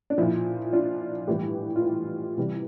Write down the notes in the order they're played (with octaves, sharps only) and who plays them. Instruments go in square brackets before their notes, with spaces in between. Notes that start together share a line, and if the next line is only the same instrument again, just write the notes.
[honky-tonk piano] D4
A#2 F3 E4
D4 F4
A2 E3 G3 E4 G4
F4
E4
C3 E3 G3